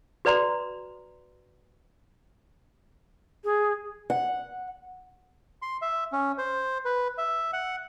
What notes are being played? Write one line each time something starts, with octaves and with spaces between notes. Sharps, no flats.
F#4 B4 D5 A#5 C6
G#4
F#5
C6
E5
C#4
C5
B4
E5
F#5